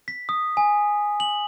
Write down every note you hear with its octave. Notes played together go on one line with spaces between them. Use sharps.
B6
D#6
G#5
F#7